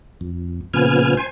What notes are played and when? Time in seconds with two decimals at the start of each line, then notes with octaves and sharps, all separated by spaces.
0.21 F2
0.74 A#2 C#3 F3 B3 G#5 F6
1.17 C5 G#5